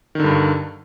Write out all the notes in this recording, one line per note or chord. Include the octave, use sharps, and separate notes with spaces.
G2 D3 D#3